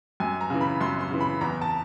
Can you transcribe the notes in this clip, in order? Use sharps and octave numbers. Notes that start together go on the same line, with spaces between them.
F#2 G#5
A#5
C#3 E3
B5
F#2 C6
C6
C#3 E3
B5
E2 A#5
A5